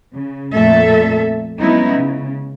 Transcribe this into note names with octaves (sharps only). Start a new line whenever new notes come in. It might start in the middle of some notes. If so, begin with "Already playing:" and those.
C#3
F2 A#2 A3 A4 E5
F#3 G#3 B3 C#4 D#4 E4
C#3